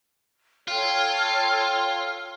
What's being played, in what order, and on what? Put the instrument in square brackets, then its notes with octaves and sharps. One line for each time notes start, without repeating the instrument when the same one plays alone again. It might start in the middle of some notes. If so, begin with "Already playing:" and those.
[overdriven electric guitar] F4 [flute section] A4 C#5 G5